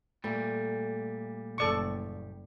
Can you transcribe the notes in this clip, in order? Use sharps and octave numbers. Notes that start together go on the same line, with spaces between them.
A#2 G3 A3
F#1 A4 D5 C#6